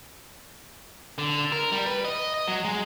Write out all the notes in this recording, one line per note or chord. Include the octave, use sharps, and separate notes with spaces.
D3
A#4
G3
B4
D#5
D#5
F#3
G#3